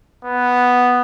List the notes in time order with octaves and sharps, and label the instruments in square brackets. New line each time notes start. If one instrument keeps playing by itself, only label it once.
[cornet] B3